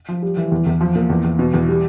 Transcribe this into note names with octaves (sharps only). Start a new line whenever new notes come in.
F3
G3
E3
E2
E2
F3
A#2
E2
E2
B2
E2
G3